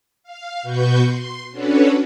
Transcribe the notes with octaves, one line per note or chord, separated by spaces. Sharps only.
F5
B2 F#4 B4 C#6 G6
C6
C#4 D4 F#4 A4 B4 C#5